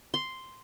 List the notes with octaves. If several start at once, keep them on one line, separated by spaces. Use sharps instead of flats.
C6